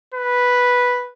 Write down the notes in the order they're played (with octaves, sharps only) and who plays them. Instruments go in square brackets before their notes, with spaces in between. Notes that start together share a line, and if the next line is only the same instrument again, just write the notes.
[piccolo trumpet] B4